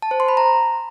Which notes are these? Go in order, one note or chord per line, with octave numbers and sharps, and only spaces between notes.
A5
C5
C6
B5
A#5